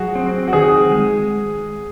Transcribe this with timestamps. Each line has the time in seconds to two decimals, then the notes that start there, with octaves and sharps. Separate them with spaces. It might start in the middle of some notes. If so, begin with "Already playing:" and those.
Already playing: F#3 F#4 G#4
0.15 C4
0.48 F#4
0.53 D#3 G#4
0.91 G#3